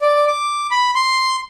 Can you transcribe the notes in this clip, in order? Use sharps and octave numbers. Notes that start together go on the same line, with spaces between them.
D5
D6
B5
C6